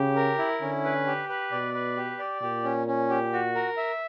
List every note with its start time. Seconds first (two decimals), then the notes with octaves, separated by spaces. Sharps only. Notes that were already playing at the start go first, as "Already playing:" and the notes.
Already playing: C#3 G4
0.16 A#4
0.38 E4
0.61 D3 C#4
0.84 B4
1.06 G4
1.29 B4
1.52 B2 D5
1.74 B4
1.97 G4
2.19 D5
2.42 A#2 G4
2.64 C#4
2.87 C#4
3.10 G4
3.33 F#4
3.55 A#4
3.77 E5